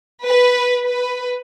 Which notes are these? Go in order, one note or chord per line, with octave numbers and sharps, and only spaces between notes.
B4
B4